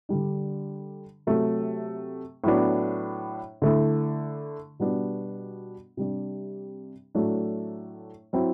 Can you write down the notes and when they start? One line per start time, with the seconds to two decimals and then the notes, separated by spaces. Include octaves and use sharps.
0.09 D3 G3 D4
1.27 C3 F#3 A3
2.44 A2 F#3 B3 D4
3.62 D3 A3 E4
4.80 B2 G3 B3 D4
5.97 C3 G3 D4
7.15 A2 F#3 A3 D4
8.33 F#3 C4 E4